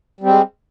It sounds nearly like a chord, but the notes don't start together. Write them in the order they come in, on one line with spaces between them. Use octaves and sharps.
G3 C4 G#3